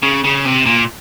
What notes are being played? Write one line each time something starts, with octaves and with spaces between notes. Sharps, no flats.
C#3
C#3
C3
A#2